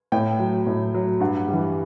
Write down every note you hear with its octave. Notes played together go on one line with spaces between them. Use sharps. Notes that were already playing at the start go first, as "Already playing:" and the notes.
A2 G5
F#3
A2
F#3
G2 F#5
E3 G3